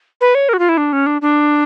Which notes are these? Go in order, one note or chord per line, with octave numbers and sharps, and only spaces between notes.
B4
C#5
A#4
F#4
F4
E4
D4
C#4
D4
D4